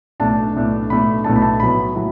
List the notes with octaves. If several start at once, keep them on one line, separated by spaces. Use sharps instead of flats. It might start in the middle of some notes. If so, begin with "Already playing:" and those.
B1 A2 A3 D4 A5
B1 A2 A3 D4
B1 A2 A3 D4 B5
B1 A2 A3 D4 A5
B5
A5
B1 A2 F#3 B3 B5
A2 F#3